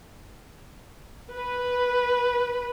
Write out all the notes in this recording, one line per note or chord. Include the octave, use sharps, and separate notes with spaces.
B4